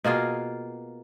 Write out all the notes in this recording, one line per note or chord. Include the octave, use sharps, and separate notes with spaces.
B2 A#3 F4 G#4